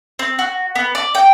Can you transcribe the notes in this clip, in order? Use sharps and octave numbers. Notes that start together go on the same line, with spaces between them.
C4
F#4
B3
D5
G5